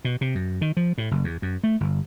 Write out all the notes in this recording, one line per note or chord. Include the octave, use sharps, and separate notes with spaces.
B2
C3
F#2
D#3
F3
A2
F#1
E2
F#2
A3
G1